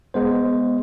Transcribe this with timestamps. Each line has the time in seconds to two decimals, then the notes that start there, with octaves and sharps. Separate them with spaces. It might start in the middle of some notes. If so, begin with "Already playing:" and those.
0.14 G#3 B3 C5